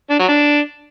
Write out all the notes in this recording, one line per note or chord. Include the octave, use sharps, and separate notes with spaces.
D4
F#3
D4